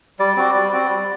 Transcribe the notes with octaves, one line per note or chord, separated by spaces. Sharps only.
G3 D5
C4 F#4
G3
C4 F#4
G3